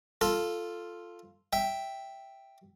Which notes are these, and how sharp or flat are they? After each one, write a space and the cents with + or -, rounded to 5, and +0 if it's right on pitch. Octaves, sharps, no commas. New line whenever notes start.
F4 +0 A4 +0
E5 +0 G5 +0